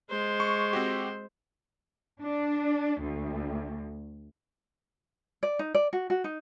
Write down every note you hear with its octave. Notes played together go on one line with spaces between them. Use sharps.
G#3 C5
C#6
C4 F#4 G4
D4
D2
D5
D#4
D5
F#4
F#4
D#4